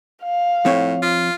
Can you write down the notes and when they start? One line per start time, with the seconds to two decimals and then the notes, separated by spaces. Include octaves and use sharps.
0.24 F5
0.65 A2 F3 C4 C#5
1.02 F4